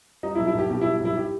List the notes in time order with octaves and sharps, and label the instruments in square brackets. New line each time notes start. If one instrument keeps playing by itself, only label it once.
[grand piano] G3 D#4
E4
B1
E4
B1 G4
B2 G4
E4
G3
B1 E4
G4